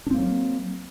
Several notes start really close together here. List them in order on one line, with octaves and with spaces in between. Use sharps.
D4 C4 A#3 F#3